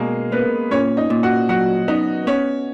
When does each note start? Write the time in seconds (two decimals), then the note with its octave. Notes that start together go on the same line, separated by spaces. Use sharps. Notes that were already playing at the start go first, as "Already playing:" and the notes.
Already playing: B2 G#3 A#3 G#4 A#4
0.32 A#3 B3 B4
0.71 A#2 C#4 C#5
0.97 D#4 D#5
1.10 A#2
1.23 F#4 F#5
1.49 F#3 F#4 F#5
1.88 B3 D#4 D#5
2.27 B3 C#4 C#5